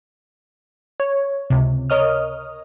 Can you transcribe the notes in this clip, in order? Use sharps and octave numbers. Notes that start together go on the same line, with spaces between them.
C#5
C#2 C3
A#4 C#5 D#5 D#6 F6